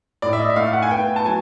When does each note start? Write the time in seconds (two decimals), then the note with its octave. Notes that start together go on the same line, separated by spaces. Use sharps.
0.22 A2 D5
0.33 E5
0.39 D#5
0.50 E5
0.56 A3 F5
0.73 F#5
0.82 G#5
0.90 B3 G5
1.16 A5
1.25 F#3 G#5